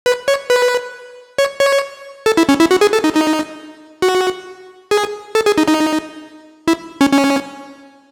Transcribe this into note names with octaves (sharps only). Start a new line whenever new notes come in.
B4
C#5
B4
C#5
C#5
A4
E4
C#4
E4
F#4
G#4
A4
D#4
D#4
F#4
G#4
A4
G#4
D#4
D#4
E4
C#4
C#4